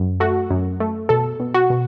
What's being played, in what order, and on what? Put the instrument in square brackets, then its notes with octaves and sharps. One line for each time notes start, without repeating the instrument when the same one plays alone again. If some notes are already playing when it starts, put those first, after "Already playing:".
Already playing: [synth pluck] F#2
A3 F#4
F#2
A3
B2 A4
B2
F#4
B2